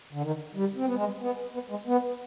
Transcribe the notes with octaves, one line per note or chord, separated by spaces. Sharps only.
D3
D#3
G3
C4
B3
G#3
G3
B3
B3
G#3
B3